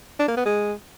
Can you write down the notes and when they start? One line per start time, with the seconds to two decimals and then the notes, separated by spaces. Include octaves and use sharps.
0.19 D4
0.28 A#3
0.37 B3
0.46 G#3